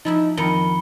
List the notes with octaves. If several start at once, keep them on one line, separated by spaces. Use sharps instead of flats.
F3 D#4 E4 E5
F2 D#3 A#4 B5 C#7 G7